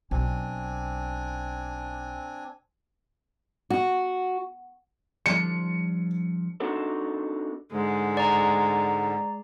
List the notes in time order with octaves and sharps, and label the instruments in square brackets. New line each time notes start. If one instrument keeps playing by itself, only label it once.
[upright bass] B1 [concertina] C4 D4 G#5
[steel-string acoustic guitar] F#4
[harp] F3 G3 D4 [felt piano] C#7
[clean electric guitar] C4 D4 D#4 F#4 A4 A#4
[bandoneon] G#2 D3 [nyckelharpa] G#3
[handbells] D5 A#5